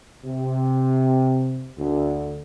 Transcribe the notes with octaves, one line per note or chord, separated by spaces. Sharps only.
C3
D2